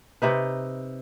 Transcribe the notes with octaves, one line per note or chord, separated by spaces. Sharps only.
C3 D#4 B4